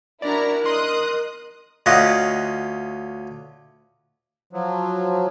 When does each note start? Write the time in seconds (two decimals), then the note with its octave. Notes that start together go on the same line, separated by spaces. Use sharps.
0.22 D4 E4 F#4 A#4 D5 A#5
0.66 D#5 C6 D#6 F#6
1.86 D2 C#4 F4 D#5 F#5
4.53 F3 F#3